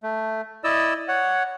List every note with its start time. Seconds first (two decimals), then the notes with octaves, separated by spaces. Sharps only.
0.03 A3
0.64 E4 D5 D#5 E6
1.08 C#5 F#5